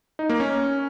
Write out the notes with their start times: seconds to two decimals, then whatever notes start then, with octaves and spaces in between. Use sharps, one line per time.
0.19 D#4
0.29 A#3
0.40 C#4